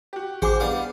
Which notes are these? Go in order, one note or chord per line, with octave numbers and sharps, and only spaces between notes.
F#4 G4
A1 G#4 C5 G#5 D6
G3 B3 D4 F5 F#5